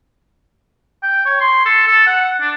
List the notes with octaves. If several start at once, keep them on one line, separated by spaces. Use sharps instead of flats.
G5
C#5
C6
A4
A4
F#5
D4